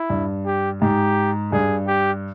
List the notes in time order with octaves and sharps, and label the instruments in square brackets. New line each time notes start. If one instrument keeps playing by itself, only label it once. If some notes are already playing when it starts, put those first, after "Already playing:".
Already playing: [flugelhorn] E4
[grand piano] G2
[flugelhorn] G4
[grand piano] G#2 [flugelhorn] G4
[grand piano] G2 [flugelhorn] G#4
[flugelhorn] G4